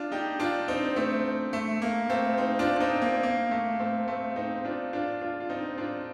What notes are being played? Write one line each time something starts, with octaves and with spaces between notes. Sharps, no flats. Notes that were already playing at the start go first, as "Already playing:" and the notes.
Already playing: D4 F4
D#4 G4
D4 F4
C4 D#4
A3 C4
A3
A#3
A3 C4
C4 D#4
D4 F4
D4
C4 D#4
A#3
A#3
A3
A3 C4
A3 C4
C4 D#4
D4 F4
D4 F4
D4 F4
F4
C4 D#4
D4 F4